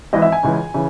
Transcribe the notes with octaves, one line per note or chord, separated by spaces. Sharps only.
G#1 G#2 E3 D#5
E5
G#5
C#2 C#3 E3
C#3 E3